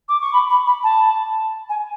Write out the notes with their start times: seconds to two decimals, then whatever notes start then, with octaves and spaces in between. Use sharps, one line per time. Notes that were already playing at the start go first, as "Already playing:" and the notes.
0.09 D6
0.21 C#6
0.33 B5
0.50 B5
0.67 B5
0.84 A5
1.69 G#5